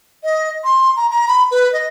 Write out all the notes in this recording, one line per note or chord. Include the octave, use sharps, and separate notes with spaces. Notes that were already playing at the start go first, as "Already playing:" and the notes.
D#5
C6
A#5
A#5
B5
B4
D#5